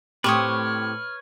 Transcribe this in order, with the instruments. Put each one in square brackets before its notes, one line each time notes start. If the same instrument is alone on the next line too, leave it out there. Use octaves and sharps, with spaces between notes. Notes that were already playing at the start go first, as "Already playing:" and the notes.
[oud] A2 C4 [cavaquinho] G4 C#6 D#6 [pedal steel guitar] B4 C#5 [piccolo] F6